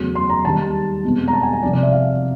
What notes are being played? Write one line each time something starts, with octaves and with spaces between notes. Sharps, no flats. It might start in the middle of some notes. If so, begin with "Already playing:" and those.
Already playing: E2 C#3 F#3 A3
C6
A#5
D#2 D#3 G3 A5
E2 B2 G#3 C4
A#5
A5
G#5
G#5
C2 C3 F3 D5
D5
E5
F5